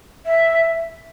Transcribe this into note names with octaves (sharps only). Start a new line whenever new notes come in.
E5